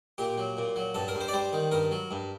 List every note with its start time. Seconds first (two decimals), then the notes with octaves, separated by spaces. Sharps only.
0.18 A#2 G4
0.38 F#3
0.57 A#2
0.76 F#3
0.94 G2 A4
1.08 A#4
1.15 G2
1.21 C5
1.28 D5
1.33 G3 C5
1.53 D#3
1.71 G2 A#4
1.91 F#3
2.11 G2